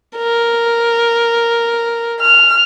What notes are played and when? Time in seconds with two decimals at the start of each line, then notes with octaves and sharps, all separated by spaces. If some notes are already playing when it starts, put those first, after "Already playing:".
0.17 A#4
2.21 F6